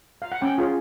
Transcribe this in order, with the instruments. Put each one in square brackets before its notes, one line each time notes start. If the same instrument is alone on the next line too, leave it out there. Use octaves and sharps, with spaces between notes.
[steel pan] F5
F#5
C#4 G5
F4 G#4 C#5